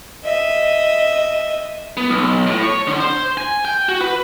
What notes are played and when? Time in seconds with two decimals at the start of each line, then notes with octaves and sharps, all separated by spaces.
0.24 D#5 E5
1.97 B3
2.10 B1
2.47 A2
2.63 C#5
2.87 D3
3.00 C5
3.37 G#5
3.65 G5
3.89 F#4
4.01 B4